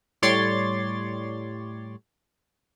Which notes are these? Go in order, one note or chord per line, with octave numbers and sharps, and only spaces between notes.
A2 G3 C#5 D5 C6 A6